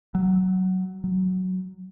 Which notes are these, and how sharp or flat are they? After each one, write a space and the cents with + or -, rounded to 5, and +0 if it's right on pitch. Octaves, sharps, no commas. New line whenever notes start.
F#3 +10
F#3 +5